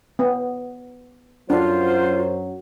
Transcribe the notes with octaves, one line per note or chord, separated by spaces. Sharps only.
B3
F#2 F#3 D4 F4 C5